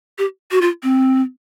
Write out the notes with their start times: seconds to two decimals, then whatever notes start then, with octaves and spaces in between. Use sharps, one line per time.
0.18 G4
0.51 F#4
0.61 F4
0.83 C4